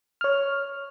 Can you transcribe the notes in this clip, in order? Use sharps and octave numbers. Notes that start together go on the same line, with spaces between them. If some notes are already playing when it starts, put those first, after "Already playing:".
C#5 F6